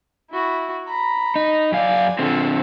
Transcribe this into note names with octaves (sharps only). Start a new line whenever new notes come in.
E4 F#4
A#5 B5
D#4
F#2 D5 F5 G#5
D3 C4 F4 A4